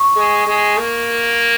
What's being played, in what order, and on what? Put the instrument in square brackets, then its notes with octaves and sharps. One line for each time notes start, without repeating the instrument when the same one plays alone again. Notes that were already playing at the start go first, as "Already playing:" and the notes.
Already playing: [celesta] C#6
[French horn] G#3
G#3
A#3